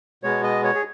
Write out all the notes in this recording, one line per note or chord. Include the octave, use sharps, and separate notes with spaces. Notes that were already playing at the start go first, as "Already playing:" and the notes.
B2 G#3 B3 C#5
D#5
C#5
G#4